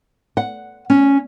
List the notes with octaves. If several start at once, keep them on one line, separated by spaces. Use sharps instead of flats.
F#5
C#4